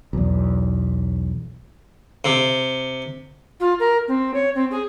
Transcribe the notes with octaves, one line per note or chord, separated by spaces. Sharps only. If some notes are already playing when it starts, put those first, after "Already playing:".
B1 E2
C3
F4
A#4
C4
C#5
C4
G#4